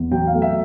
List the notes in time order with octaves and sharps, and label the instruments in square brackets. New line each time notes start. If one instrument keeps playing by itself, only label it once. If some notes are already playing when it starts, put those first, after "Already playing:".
Already playing: [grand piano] E2
F#3 G5
F5
A3
E5